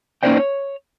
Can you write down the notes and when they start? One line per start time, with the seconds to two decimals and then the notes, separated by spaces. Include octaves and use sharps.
0.23 A#3 C#4 D#4 C5 D5 G5
0.37 C#5